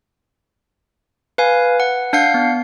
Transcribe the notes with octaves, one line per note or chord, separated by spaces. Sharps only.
B4 F5 G#5
F#5
D4 F5 F#5 G6 C7
B3